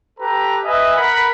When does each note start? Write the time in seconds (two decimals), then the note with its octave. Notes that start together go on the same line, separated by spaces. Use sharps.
0.19 G4 A4 B4 A#5
0.65 B4 D#5 E5 G#5
0.97 A#4 F#5 B5